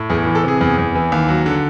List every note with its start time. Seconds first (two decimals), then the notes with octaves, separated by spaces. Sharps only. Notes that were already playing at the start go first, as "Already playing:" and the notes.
Already playing: A2
0.10 E2 G#4
0.27 E3
0.35 A4
0.44 C3 G#4
0.61 E2
0.78 E2
0.95 E3
1.12 D#2
1.29 F#3
1.46 D3